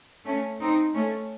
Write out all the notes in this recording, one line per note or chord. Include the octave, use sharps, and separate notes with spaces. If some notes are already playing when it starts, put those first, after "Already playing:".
A3 C#4
C4 D#4
A3 C#4